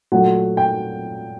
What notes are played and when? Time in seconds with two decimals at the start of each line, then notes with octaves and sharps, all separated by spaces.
0.12 A#2 F#3 A3 F#5
0.57 G5